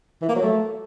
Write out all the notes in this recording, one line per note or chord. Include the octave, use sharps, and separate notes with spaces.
E3
A#3
F#3
A3